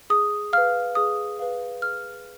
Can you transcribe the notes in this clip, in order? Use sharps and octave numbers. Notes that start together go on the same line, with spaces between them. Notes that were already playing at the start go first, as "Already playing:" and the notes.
G#4 D#6
B4 F5 F6
G#4 D#6
B4 F5
G#4 F6